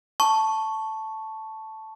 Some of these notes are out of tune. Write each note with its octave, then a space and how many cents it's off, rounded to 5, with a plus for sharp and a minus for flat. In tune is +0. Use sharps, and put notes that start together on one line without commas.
A5 +0 C#6 +0